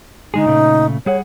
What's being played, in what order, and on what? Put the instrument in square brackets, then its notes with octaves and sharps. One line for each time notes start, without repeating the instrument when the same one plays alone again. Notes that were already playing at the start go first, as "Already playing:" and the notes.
[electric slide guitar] D3 G#3 G#4 [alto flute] D#4
[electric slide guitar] A#2 C#3 A3
[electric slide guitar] G3 G#4 F#5 [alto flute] C#5